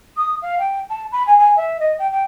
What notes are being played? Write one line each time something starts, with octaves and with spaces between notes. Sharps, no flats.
D#6
F5
G5
A5
B5
G#5
G#5
E5
D#5
G5
G5